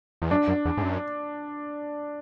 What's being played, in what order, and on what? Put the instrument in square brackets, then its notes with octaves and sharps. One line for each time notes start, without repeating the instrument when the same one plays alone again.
[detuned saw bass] E2
[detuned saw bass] F#2 [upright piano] D4
[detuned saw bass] F#2
E2
G#2
F#2